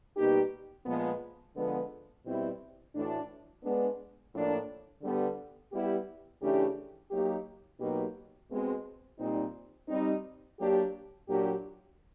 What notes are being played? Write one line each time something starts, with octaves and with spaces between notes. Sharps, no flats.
B2 G3 A#3 D#4 G4
A#2 F3 G#3 B3
D3 F3 G#3 B3
B2 G3 C4 E4
A2 E3 A3 D4 F#4
G#3 B3 D4
A2 F3 A#3 D4
D3 G3 B3
G3 B3 E4 G4
C#3 E3 A3 D4 G4
F#3 A#3 D#4 G4
B2 F#3 A#3 D#4 G4
B2 G#3 C4
A#2 G3 C4 D#4
G3 C4 D#4
F#3 A#3 D4 G4
A#2 F#3 A#3 D4 G4